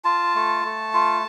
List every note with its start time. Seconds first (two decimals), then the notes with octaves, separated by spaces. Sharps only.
0.05 F4 A5
0.35 A3
0.65 A3
0.94 F4